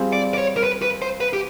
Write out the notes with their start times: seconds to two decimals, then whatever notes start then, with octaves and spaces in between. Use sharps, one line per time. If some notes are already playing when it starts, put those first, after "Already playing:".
Already playing: G3 C4 F4 G#4 C5
0.13 D5
0.34 D5
0.38 C#5
0.57 A#4
0.64 B4
0.82 B4
1.02 C5
1.20 B4
1.33 G4